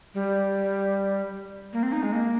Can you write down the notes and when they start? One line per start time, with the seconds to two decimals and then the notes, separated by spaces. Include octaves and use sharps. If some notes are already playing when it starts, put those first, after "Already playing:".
0.14 G3
1.73 A#3
1.83 C4
1.92 D#4
2.03 G#3
2.12 A#3